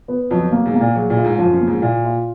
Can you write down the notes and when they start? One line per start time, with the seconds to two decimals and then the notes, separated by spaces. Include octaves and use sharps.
0.08 B3
0.31 F2 F#3
0.52 A#3
0.66 G#2
0.74 A#3
0.81 A#2
0.95 F#3 G#4
1.10 A#2
1.17 F4
1.25 G#2
1.38 F#2 F3
1.53 F#2
1.61 A#3
1.68 G#2
1.82 A#2 F4
2.04 F4